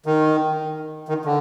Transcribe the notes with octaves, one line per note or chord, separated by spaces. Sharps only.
D#3
D#3
D3